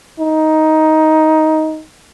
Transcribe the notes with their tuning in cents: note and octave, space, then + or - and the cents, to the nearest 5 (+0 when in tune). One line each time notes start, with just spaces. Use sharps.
D#4 +10